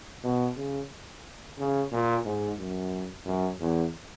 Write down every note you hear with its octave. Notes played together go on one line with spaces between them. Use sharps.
B2
C#3
C#3
A#2
G#2
F#2
F#2
E2